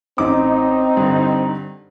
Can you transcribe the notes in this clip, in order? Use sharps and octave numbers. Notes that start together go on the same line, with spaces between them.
A1 C4 D#4 D6
G2 D3